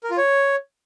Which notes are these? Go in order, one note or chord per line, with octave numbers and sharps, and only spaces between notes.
A#4
F4
C#5